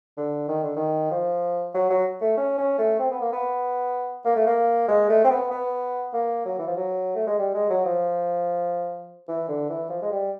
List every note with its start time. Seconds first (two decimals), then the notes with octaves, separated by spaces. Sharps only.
0.17 D3
0.48 D#3
0.63 D3
0.76 D#3
1.11 F3
1.74 F#3
1.90 F#3
2.21 A3
2.37 C#4
2.58 C#4
2.78 A3
2.99 C4
3.11 B3
3.21 A#3
3.33 B3
4.25 A#3
4.36 A3
4.47 A#3
4.88 G#3
5.09 A3
5.24 C4
5.30 B3
5.51 B3
6.13 A#3
6.45 F#3
6.59 E3
6.67 F3
6.76 F#3
7.15 A3
7.27 G#3
7.39 G3
7.54 G#3
7.70 F#3
7.86 F3
9.28 E3
9.48 D3
9.69 E3
9.90 F3
10.02 G#3
10.11 G3